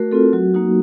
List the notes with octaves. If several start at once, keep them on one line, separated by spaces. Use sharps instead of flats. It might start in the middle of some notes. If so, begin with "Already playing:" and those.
Already playing: A3 F#4 A#4
C4 F4 A4
F#3 F#4
A#3 D#4 F#4